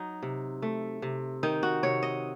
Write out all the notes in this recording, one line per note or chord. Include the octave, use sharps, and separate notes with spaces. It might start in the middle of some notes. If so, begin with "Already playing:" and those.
Already playing: F#3 D#4
C3
A3
C3
D#3 D#4
F#4
C3 C#5
D#5